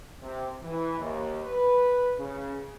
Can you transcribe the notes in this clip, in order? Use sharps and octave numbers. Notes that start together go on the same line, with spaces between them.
C3
E3
D#2
B4
C#3